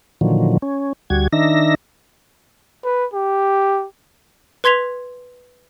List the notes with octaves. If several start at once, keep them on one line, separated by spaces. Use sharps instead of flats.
A#2 D3 D#3 F3 F#3
C#4
D2 G3 F#4 G#6
D#3 D4 D#4 E5 A#6
B4
G4
B4 C6 G#6 B6 F7